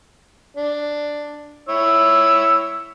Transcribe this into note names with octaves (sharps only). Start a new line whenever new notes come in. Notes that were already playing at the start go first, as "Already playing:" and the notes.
D4
E4 C#5 E6